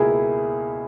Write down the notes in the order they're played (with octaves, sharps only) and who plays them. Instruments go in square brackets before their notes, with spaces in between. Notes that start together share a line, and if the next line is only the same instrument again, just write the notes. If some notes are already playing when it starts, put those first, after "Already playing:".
Already playing: [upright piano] C#2 B2 A#3 E4 A#4 [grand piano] G#4